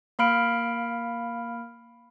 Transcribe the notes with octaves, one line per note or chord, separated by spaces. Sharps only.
A#3 F5 B5 F6 D7